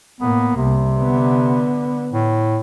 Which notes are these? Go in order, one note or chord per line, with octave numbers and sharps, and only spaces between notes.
A2 A#3 B3
C2 C3
D3 B3
A2